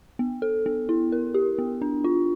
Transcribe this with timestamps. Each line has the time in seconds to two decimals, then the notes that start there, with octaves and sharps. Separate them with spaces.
0.19 B3
0.42 A4
0.66 B3
0.89 E4
1.12 A#4
1.34 G4
1.59 B3
1.82 D4
2.04 F4